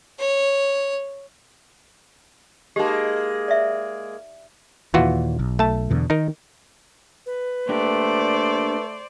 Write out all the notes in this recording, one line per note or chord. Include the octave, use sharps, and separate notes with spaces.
C#5
G#3 A#3 D#4 G4
D5 E5
D#2 A#2 E3 F4 F#4
B1
A3 A5
E2 B2 D3
D#3 D#4 A#4
B4
A3 A#3 D4 G4 C5 D5